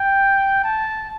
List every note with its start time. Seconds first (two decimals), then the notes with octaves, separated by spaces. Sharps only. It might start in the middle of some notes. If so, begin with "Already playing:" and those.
Already playing: G5
0.64 A5